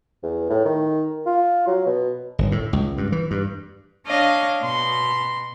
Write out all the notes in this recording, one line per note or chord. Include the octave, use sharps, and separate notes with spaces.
E2
A2
D#3
F4
F#3
B2
G1
A2
C#2
G2
E3
G2
D4 C#5 D#5 F5
B2 C6